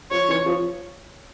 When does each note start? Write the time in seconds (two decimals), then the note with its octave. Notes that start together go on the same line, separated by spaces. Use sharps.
0.11 F3 C#5
0.29 E3
0.46 F3